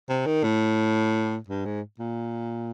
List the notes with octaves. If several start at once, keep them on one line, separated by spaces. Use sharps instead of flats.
C3
D#3
A2
G2
G#2
A#2